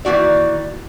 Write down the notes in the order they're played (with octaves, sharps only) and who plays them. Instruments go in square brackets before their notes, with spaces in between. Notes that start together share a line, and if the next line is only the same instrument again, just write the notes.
[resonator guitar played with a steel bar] D#3 E3 A#3 F#4 D5